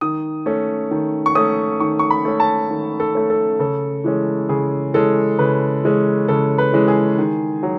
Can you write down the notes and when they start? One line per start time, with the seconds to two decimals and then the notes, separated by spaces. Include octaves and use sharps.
0.01 D#3 D#6
0.46 A3 C#4
0.91 D#3
1.26 C#6
1.35 A3 C#4 D#6
1.80 D#3 C#6
1.99 C#6
2.10 B5
2.25 A3 C#4
2.40 A5
2.70 D#3
3.00 A4
3.15 A3 C#4
3.30 A4
3.59 C#3 A4
4.04 E3 G#3 C#4
4.49 C#3 G#4
4.93 E3 G#3 C#4 A4
5.39 C#3 B4
5.84 E3 G#3 C#4
6.28 C#3 A4
6.58 B4
6.73 E3 G#3 C#4
6.88 G#4
7.18 D#3
7.63 F#3